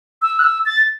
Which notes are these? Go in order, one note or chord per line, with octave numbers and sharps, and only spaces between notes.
E6
F#6
E6
A6